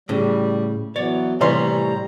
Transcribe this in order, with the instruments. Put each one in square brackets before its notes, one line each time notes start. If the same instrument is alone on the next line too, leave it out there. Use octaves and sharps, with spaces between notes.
[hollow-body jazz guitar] A2 C#3 [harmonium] G3
[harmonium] E3 F#3 B3 [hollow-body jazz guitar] C#5 D5
[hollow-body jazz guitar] A2 C3 G3 [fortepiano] E3 C#5 C6 [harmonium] A#5